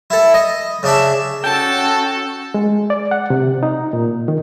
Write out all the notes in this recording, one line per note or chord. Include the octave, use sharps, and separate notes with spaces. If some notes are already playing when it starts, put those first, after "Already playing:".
E4 A4
D#5
C#3 D4 E5
C#4 F#4 A4 G5 A5
G#3
D5
F#5
C3
D#4
A#2
D#3